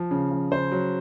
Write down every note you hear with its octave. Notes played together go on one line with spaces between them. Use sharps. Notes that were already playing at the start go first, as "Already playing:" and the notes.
Already playing: F3
C#3
F3
C#3 C5
F#3